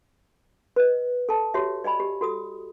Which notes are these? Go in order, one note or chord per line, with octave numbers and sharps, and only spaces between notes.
B4 D#5
A4 A5
F#4 G4 C#5 E5
D5 D#5 G#5 B5
G4
F#4 A4 D#6